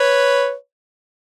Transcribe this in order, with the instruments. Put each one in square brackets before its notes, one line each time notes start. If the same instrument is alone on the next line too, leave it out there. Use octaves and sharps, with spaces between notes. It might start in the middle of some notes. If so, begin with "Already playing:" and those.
Already playing: [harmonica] B4 C#5